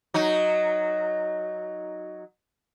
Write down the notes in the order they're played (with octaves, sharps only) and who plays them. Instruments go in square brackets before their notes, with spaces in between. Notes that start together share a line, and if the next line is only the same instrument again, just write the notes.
[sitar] F#3 D#4